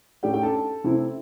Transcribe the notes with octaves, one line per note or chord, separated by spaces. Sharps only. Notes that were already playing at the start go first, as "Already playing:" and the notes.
A2 A3 D4 G4 G5
G4 G5
A4 A5
C3 A3 C4 E4